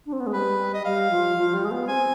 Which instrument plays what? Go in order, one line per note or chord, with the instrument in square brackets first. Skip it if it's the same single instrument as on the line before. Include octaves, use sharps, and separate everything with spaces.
[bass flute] D4
C4
B3
G#3
[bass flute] G3 [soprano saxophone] B4
[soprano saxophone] D#5
[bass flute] G3 [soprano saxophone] F5
[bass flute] F3
F3
G3
G#3
B3
[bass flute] C4 [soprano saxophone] G#5